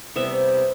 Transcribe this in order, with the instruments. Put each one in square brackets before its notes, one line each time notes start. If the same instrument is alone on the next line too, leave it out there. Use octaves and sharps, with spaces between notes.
[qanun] C3 G3 B3 E5